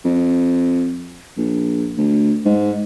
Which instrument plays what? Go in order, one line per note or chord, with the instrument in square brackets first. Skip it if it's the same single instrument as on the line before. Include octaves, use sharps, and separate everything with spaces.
[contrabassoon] F2
A#1
D2
G#2